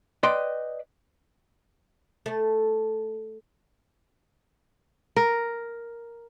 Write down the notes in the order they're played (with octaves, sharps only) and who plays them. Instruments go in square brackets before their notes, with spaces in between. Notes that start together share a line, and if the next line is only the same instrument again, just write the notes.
[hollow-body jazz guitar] B4 D5 D#5 G5 C6
[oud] A3
[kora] A#4